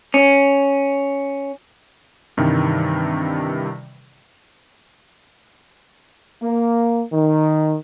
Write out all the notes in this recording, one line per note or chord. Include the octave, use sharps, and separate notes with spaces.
C#4
G2 C3 D#3 E3 G3
A#3
D#3